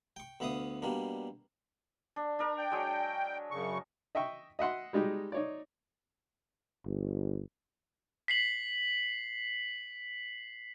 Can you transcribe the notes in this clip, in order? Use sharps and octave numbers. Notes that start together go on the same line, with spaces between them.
G5 C#6
D2 B3 E5 F5 D#6
B2 G3 A#3 D4
D4
D4 A#4
G5
F#3 G#3
F#2 C#3 C#6
D#5 E5 G5 C#6
D#5 E5 F#5 C6
G3 G#3 D#4 G4
D#4 C#5 D5
G1
B6 C7 F#7